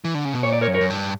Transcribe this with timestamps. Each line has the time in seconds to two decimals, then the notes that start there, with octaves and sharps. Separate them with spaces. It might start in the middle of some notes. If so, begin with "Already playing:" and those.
0.05 E3
0.15 D3
0.25 C#3
0.34 B2
0.43 A#2 C#5
0.52 D5
0.61 A#4 C#5
0.68 F#2
0.74 A#4 C#5
0.81 F#2
0.90 G2